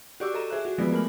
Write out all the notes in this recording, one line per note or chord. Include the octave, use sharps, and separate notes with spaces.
F#4 G4 D5 C#6 D6 E6
A4 D#5 A#5 E7
G#4 C5 E5 F#6
F#4
F3 G#3 B3 E4 B4 D5
A3 A#4 G#5 B5 F6 F#7